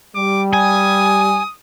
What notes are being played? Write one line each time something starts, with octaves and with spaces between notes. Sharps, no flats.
G3 D6
G#5 D#6